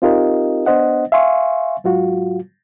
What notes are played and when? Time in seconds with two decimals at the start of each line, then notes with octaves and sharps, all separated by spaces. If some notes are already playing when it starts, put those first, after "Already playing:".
0.02 C4 D#4 F4 G4 A#4 D#5
0.66 B3 D4 C5 D#5 F#5
1.12 E5 F5 G#5 C6 C#6
1.84 G#2 F#3 F4 F#4